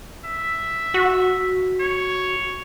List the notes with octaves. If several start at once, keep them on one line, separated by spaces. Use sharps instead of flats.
E5
F#4
C#5